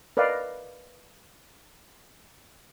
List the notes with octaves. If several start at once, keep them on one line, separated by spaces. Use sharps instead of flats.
A#4 B4 D5 D#5 F5